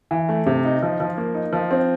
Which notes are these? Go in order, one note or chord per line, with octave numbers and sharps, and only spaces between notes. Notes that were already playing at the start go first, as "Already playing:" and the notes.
E3
A3
C3
D#4
F3
F3
A#3
D#4
F3
C4